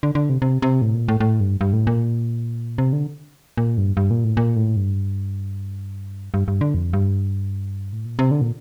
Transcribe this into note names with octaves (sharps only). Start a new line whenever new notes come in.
D3
D3
C3
C3
C3
A2
A#2
A2
A2
G2
G2
A2
A#2
C3
D3
A#2
G2
G2
A#2
A2
A#2
A2
G2
G2
G2
D3
F2
G2
A2
A#2
C3
D3
A#2